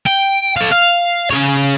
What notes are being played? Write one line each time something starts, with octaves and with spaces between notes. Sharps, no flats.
G5
A4 F5
F5
C#3 C#5